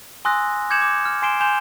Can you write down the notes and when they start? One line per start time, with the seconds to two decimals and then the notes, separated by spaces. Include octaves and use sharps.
0.25 G#5 C6 D#6 E6 F#6 A#6
0.70 D6 G6 G#6 C#7 E7 F#7
0.82 D6
1.05 F6
1.22 G#5 C6 C7 D7 E7 G7
1.40 G#5 C6 G6 E7 F7 G7